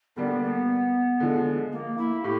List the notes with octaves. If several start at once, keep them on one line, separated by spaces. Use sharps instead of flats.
D3 G3 A#3 B3 D4
B3
D3 F3 G#3
A#3
E4
A2 G4